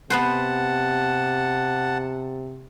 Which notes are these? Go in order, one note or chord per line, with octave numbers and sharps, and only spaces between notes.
C3 B3 B4 C5 F#5 A5